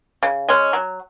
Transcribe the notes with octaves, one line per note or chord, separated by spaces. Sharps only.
C#3
G#3 C#4
F#3